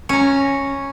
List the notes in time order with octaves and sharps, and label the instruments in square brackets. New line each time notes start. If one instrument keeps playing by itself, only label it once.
[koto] C#4 A#5